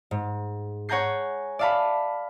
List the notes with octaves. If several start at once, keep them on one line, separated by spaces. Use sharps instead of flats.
G#2
C#5 F#5 G#5 A#5 G6 C7
D5 E5 F5 A5 B5